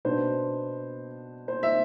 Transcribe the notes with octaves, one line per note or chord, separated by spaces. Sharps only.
B2 B3 D4 C5
C5
E5